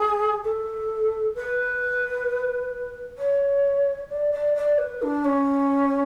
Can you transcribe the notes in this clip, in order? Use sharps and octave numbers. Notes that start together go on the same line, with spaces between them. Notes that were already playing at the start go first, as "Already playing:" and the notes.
Already playing: G#4
A4
B4
C#5
D5
D5
D5
B4
D4
C#4